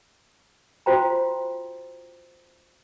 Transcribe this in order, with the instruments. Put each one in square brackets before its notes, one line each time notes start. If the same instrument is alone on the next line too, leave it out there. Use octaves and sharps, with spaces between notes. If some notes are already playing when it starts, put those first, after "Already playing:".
[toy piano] F4 F#4 C5 G5 A#5